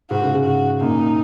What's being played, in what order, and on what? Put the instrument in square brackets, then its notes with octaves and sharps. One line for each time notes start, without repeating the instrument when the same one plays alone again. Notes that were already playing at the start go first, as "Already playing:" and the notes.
[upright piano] G#2 [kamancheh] F#4
[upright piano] G#2 C#3
G#2 C#3
[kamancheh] F#4
[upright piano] F#2 A#2 [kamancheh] D#4